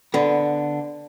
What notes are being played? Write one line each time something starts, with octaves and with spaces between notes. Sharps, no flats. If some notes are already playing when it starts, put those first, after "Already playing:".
D3 B3